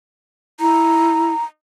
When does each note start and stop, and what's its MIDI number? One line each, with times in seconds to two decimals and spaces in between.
0.60 1.34 64
0.60 1.44 82